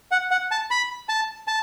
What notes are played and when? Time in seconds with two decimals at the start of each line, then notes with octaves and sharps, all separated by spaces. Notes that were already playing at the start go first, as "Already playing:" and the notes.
0.11 F#5
0.31 F#5
0.51 A5
0.71 B5
1.09 A5
1.48 A5